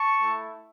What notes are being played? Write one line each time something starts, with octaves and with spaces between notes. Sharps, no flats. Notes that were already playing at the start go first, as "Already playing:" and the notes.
Already playing: A5 C#6
A3 E4